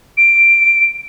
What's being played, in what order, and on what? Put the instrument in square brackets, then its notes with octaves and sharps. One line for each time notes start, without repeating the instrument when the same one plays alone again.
[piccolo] D7